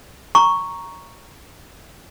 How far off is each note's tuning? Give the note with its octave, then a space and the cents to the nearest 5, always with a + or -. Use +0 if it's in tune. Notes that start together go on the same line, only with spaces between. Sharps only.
A#5 +0 C#6 +0